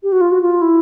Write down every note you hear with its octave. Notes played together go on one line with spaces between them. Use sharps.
G4
F#4
F4
F#4
F4
E4